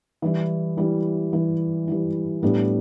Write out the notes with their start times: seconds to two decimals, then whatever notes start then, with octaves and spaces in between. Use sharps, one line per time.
0.22 E3 G3 E4
0.77 E3 G3 E4
1.33 E3 G3 E4
1.88 E3 G3 E4
2.42 A2 G3 B3 D4